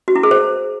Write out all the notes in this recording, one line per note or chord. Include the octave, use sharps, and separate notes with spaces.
F#4
E4
G#4
C5